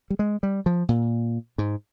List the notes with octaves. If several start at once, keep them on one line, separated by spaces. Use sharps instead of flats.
G3
G#3
G3
F3
A#2
G#2